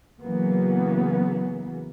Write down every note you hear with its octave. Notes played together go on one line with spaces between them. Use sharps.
C#3 E3 F#3 A#3 B3